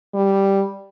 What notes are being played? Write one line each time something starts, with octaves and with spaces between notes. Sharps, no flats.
G3